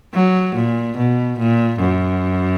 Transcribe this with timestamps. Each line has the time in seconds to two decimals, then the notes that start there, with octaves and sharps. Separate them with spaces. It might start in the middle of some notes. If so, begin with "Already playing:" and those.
0.14 F#3
0.55 A#2
0.97 B2
1.39 A#2
1.80 F#2